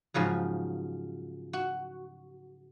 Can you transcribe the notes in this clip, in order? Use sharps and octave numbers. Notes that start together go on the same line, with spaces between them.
G#2 C#3 F3 F#3
F#4